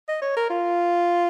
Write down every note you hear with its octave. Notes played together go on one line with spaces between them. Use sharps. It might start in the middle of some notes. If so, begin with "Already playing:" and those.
D#5
C#5
A#4
F4